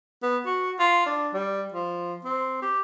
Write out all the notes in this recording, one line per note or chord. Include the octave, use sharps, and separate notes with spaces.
B3
F#4
F4
D4
G3
F3
C4
G4